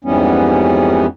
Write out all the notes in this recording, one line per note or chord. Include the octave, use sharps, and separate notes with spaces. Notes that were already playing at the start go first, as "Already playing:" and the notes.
F2 G#2 E3 G3 B3 C#4